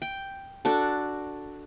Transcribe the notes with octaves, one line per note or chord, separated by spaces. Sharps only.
G5
D4 F#4 A4